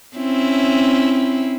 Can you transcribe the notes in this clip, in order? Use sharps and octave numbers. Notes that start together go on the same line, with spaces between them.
C4 C#4 E4